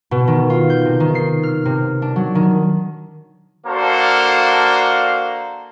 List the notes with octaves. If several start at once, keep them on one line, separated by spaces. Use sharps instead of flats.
B2
D#3
F4
G6
C3
D#3
C7
F6
C3
D4
F#3
D#3
A#3 D4 F#4 A4 C5 F5